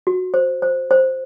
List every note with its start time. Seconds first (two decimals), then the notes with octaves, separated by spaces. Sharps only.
0.07 F#4
0.34 C5
0.62 C5
0.91 C5